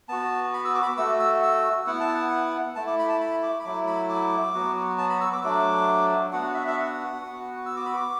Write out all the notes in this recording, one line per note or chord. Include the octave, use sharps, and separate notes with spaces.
B3 F#4 A5
B5
E6
D6
B5
D6
A3 F#4 E6
E6
E6
B3 E4 F#5
A5
F#5
A3 E4 A5
D6
B5
A5
B5
D6
B5
F#3 A3 E4 D6
B5
D6
F#3 B3 F#4
A5
B5
E6
D6
F#3 A3 D4 D6
B3 D4 F#4 F#5
E5
E5
F#5
B3 F#4
E6
D6
B5
D6